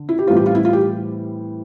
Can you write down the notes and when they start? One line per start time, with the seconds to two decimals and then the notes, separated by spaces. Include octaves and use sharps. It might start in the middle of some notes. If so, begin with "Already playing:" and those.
Already playing: D3
0.09 E4
0.19 G4
0.27 A2 E3 G3 C4 F4
0.36 G4
0.46 F4
0.55 E4
0.65 F4
0.73 G4